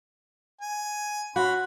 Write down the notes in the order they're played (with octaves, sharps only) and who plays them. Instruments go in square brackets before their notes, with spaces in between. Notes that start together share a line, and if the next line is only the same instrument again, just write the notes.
[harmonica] G#5
[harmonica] C#4 B5 C6 [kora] F#4